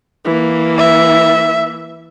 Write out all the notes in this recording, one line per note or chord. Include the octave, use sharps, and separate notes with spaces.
E3 A#3
E5